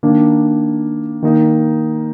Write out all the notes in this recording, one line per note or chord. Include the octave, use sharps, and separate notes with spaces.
D#3 A#3 D4
D#3 A#3 D#4